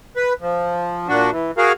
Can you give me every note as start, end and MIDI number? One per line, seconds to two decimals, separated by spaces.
0.16 0.33 71
0.41 1.08 53
1.08 1.30 46
1.08 1.30 62
1.08 1.30 66
1.31 1.51 52
1.58 1.72 66
1.58 1.72 68
1.58 1.72 70
1.58 1.72 77